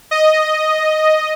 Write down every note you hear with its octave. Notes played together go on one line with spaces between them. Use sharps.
D#5